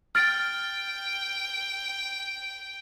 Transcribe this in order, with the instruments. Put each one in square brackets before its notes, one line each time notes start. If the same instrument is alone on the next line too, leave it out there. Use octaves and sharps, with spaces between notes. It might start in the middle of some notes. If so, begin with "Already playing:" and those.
[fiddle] G5 [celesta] F6 A6 D7